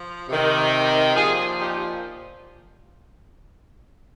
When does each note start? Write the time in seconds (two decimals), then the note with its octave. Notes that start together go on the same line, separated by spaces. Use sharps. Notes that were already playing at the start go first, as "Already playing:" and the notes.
Already playing: F3
0.28 C3 D#3
1.15 A#2 F3 F4 G#4
1.59 D#4 G4